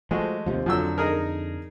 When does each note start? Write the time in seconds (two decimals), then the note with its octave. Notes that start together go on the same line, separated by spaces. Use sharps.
0.11 F3 G#3 A3 F#4
0.46 D#2 C3 F3
0.66 F2 D3 F3 F#3 E6
0.98 D#4 G#4 A#4